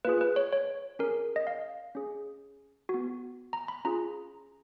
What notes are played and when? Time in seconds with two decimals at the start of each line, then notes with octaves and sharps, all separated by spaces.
0.05 A#3 F4 G#4 B4
0.21 B4
0.36 C#5
0.52 C#5
0.99 C#4 G#4 A#4
1.36 D#5
1.47 F5
1.95 C#4 G#4
2.89 B3 F#4
3.53 A#5
3.68 B5
3.85 C#4 F4 G#4 A#5